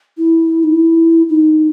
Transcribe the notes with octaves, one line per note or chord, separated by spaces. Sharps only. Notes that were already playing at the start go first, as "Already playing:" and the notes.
E4
D#4
E4
D#4